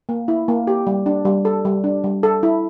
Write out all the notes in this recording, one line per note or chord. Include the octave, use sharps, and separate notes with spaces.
A#3
E4
A#3
G4
G3
D4
G3
A4
G3
D4
G3
A4
E4